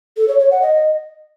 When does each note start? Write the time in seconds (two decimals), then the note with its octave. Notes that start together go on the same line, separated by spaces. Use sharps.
0.17 A4
0.28 C#5
0.39 C#5
0.51 F#5
0.62 D#5